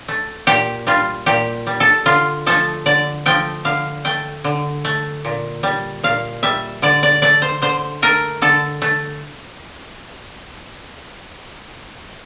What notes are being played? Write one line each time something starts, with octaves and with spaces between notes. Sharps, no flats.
A3
A#2 G4
G3 F4
A#2 G4
G3
A4
D3 F4
F3 A3 A4
D3 D5
F3 A3 G5
D3 F5
A3 G5
D3
A3
A#2
G3
A#2 F5
G3 E5
D3 D5
D5
A3 D5
C5
D3 C5
A3 A#4
D3 A4
A3